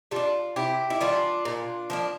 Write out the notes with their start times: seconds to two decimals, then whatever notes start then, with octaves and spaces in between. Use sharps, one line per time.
0.11 G3 D4 F4 A4
0.56 C3 E4 G4
0.90 E4
1.01 E3 G3 D4 F4
1.45 A#2
1.90 F3 A#3 D4